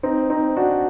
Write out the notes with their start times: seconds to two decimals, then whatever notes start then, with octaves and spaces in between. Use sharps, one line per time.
0.03 C4 D#4
0.30 C4 D#4
0.57 D4 F#4